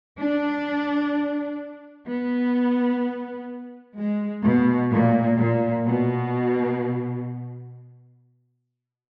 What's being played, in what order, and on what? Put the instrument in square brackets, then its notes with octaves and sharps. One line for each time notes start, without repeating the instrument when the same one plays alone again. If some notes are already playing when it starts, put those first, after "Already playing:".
[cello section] D4
B3
G#3
B2
A#2
A#2
B2